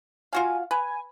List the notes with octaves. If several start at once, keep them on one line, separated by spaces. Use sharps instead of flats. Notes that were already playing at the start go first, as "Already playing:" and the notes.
F4 F#4 F5 G#5
B4 G#5